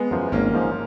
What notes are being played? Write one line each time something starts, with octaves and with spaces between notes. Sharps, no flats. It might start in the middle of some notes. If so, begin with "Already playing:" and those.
Already playing: G#3 B3
F#2 F3
G#1 A#3 C#4
G#2 F3